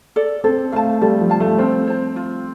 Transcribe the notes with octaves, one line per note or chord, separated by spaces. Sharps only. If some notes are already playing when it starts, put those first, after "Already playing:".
A4 D5
C4 A4
A3 F5 A5
G3 A4
F3
F5 A5
A3
C4 F4
C5 A5
F4